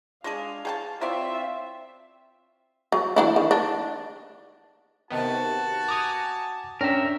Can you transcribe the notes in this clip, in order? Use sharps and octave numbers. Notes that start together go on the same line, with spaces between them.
G#3 D4 G#4 F5
G#4 G5 A5
C4 E4 F4 C#5 D5 E5
F#3
E3 D4 E4
D#3
D4
C3 D#3 B3 F#4 A5
G#5 A#5 D6 D#6
C#4 D4 A#4 E5 G5